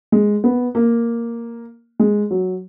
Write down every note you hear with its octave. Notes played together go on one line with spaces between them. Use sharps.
G#3
B3
A#3
G#3
F#3